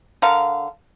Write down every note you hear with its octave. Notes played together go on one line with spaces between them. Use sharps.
D3 A#4 F5